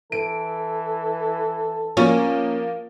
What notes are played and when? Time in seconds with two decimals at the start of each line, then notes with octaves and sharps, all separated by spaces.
0.12 E3 A4 D7
1.97 F3 A#3 C#4